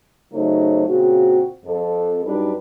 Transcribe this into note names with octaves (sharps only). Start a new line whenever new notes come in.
C#3 F#3 A3 D#4 C5
A#2 C#3 C4 F#4
F2 A4
F#2 G3 D4 D#4 B4